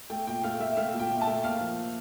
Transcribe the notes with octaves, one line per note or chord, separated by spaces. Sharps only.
A3 G5
A#2 G5
A3 F5
A3 E5
A3 F5
A#2
G5
A#2
A5
A3
A#3 F5
F3